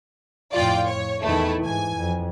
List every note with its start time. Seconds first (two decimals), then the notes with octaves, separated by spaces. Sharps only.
0.53 F2 A2 F4 D5 G5
0.88 C#5
1.23 E2 D#3 A3 E4
1.65 G#2 E3 G#5
1.95 F2